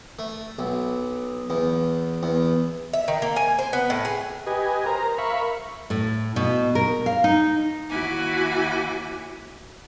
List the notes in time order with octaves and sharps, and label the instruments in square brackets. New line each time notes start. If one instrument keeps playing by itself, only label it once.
[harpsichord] A3
B1
E2
E2
[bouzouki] E5
D#3
A#3
G#5
C5
B3
A2
G#4
[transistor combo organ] G4 B4 D#5 G#5
A#4 C5 A#5
A#4 E5 F5 B5 C#6
[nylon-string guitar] A2
B2
A#4
F5
D#4
[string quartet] D#2 E4 F#4 G#5 D6